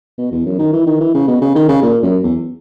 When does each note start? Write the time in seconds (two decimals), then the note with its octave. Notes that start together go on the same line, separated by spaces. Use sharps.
0.18 B2
0.32 E2
0.46 F#2
0.59 D#3
0.73 E3
0.87 D#3
1.00 E3
1.14 C#3
1.28 B2
1.41 C#3
1.55 D#3
1.69 C#3
1.82 A#2
2.03 F#2
2.24 E2